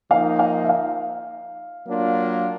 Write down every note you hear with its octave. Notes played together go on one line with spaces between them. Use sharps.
F3 A#3 D#4 F5
F5
E5
F5
F#3 A#3 D4 F4